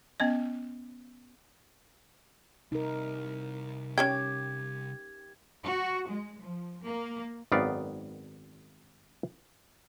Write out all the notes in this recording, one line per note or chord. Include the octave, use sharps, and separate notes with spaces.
B3 C#4 D#5
C2 D#4 A#4
C#4 G4 C#5 G5 G#6
F#4
G#3
F3
A#3
G#1 F#2 D#3 B3 D5 F5